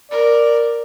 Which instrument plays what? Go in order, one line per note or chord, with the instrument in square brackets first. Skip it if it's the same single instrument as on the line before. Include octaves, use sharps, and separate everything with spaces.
[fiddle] A#4 [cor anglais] D5